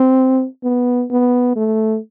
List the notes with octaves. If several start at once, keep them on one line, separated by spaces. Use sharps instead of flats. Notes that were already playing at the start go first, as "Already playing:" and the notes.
Already playing: C4
B3
B3
A3